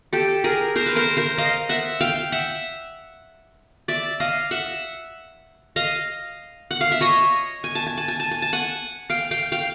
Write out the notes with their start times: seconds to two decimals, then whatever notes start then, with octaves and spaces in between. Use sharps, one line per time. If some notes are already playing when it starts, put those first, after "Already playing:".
0.13 G4 A4
0.44 G#4 A#4
0.76 A#4 C5
0.86 B4
0.96 A#4 C5
1.17 A#4 C5
1.38 D#5 F5
1.69 E5 F#5
2.01 F5 G5
2.32 E5 F#5
3.88 D5 E5
4.20 D#5 F5
4.51 E5 F#5
5.76 D#5 F5
6.71 F#5
6.81 F5
6.91 E5
7.01 C#5 D#5
7.64 G#5
7.75 A5
7.86 G#5
7.97 A5
8.08 G#5
8.20 A5
8.31 G#5
8.42 A5
8.53 F#5 G#5
9.10 F5 G5
9.31 F5 G5
9.52 F5 G5